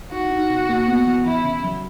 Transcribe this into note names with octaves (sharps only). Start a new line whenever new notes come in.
D#4 F#4
D#4
B2
A#3
B3
E3
E3 E4
C#3
F#3